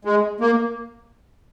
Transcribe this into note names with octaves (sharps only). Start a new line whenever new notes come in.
G#3
A#3